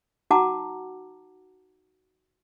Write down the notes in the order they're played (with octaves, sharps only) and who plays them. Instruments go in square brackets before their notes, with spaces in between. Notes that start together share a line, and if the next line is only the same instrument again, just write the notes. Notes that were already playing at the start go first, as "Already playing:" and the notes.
[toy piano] D#4 F#4 F#5 A5 A#5 D6